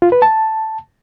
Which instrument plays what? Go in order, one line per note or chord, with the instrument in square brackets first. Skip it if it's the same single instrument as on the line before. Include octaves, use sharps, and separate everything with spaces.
[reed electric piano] F4
B4
A5